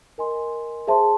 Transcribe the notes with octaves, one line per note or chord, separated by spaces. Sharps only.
A#4 D#5 G#5 C6
G#4 C5 E5 A5 C6